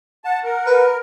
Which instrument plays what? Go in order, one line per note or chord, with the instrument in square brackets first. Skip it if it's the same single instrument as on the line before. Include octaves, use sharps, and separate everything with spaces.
[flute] F#5 [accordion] A5
[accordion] A#4
[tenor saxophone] B4